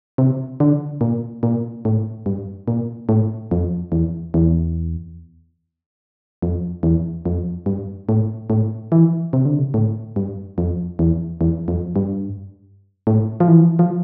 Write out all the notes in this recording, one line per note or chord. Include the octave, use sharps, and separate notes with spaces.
C3
D3
A#2
A#2
A2
G2
A#2
A2
F2
E2
E2
F2
E2
F2
G2
A2
A2
E3
C3
D3
C3
A2
G2
F2
E2
E2
F2
G2
A2
F3
E3
F3